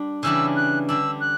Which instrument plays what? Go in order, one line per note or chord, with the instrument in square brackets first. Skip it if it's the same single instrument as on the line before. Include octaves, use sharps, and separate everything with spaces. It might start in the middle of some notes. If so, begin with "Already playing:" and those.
Already playing: [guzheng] G3 D4
[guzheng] C#3 E3 G3 D4 [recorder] E6
[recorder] F#6
[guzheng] D3 G3 D4 [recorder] E6
[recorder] F#6